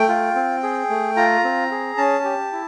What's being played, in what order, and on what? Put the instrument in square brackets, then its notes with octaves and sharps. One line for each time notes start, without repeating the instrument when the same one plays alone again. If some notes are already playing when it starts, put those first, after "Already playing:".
Already playing: [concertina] A3 G5
F4
C4
G#4
A3
F4 A#5
C4
G#4
C#4 A5
G4
E4